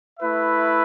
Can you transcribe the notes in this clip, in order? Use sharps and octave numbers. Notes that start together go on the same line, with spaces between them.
A3 E4 B4 E5